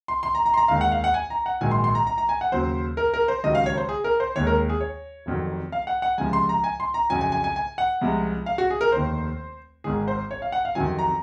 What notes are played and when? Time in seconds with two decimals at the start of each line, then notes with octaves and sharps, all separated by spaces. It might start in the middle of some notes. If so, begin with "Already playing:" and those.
0.08 C6
0.23 C6
0.35 A#5
0.46 A#5
0.54 C6
0.57 A#5
0.68 D#2 D#3 G#3 F5
0.81 F#5
0.92 F5
1.04 F#5
1.14 G#5
1.30 A#5
1.46 F#5
1.61 A#1 G#2 D#3 F#3 G#5
1.71 C6
1.84 C6
1.95 A#5
2.07 A#5
2.18 A#5
2.29 G#5
2.41 F#5
2.52 D#2 C#3 F#3 C5
2.97 A#4
3.14 A#4
3.28 C5
3.43 C#2 C3 D#3 F#3 D#5
3.55 F5
3.66 C#5
3.77 C5
3.89 G#4
4.04 A#4
4.20 C5
4.36 D#2 D#3 G#3 C#5
4.47 A#4
4.70 G#4
4.81 C#5
5.26 F1 F2 D#3 F#3
5.72 F5
5.87 F#5
6.02 F#5
6.18 C#2 C3 F3 G#3 G#5
6.33 C6
6.49 A#5
6.64 G#5
6.80 C6
6.94 A#5
7.10 F2 C#3 F#3 G#5
7.21 G#5
7.32 G#5
7.44 G#5
7.56 G#5
7.78 F#5
8.01 C2 C3 F3 G#3
8.46 F5
8.58 F#4
8.70 G#4
8.81 A#4
8.92 F1 D#2 D#3 C5
9.84 G#1 G#2 D#3 G#3 G#4
10.08 C5
10.31 C#5
10.42 F5
10.52 F#5
10.65 F5
10.75 F2 C3 D#3 F#3 G#5
10.99 A#5